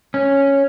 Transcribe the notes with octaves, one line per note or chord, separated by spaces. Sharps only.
C#4